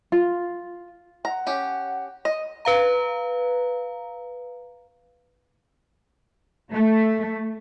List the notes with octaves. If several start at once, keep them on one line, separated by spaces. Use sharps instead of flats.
F4
F#5 A#5
C#4 G4
D#5
B4 F5 A#5
A3